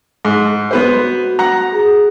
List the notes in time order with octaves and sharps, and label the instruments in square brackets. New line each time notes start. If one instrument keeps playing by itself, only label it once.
[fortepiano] G#2
[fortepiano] B3 B4 C5 [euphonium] F#4
[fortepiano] F#5 A#5
[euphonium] G#4